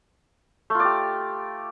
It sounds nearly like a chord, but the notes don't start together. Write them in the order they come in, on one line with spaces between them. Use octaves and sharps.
A3 F4 D5 G4